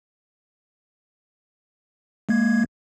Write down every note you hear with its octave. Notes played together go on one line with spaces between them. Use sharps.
G#3 A#3 G#6